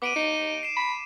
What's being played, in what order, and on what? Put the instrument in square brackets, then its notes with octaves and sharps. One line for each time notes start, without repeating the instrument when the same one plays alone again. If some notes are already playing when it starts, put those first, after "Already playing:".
[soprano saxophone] B3 [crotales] D6 D7 D#7
[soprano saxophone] D#4
[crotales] C7 E7
[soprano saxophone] B5